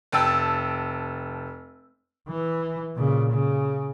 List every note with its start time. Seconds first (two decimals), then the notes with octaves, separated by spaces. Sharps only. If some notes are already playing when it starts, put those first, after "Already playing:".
0.12 F1 G5 A5 E6
2.28 E3
2.96 A#2 C#3
3.32 C#3